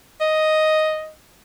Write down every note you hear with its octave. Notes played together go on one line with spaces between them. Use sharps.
D#5